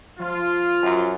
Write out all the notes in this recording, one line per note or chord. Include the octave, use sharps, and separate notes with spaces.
F3 F4
F#2